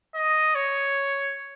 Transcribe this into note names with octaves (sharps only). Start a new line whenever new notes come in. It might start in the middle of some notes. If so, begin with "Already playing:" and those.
D#5
C#5